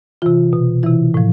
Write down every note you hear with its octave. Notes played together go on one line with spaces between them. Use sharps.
C3 E3 F4
B2
C3 E3 E4
A2 F3